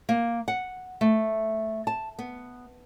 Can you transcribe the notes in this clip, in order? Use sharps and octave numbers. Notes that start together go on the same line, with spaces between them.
A#3
F#5
A3
A5
B3